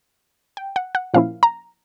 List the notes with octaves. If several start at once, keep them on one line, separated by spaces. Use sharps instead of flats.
G5
F#5
F#5
A#2 F3 A#3 C#4 E4 F5
A#5